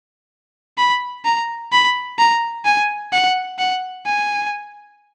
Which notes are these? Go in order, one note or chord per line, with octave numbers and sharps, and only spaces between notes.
B5
A#5
B5
A#5
G#5
F#5
F#5
G#5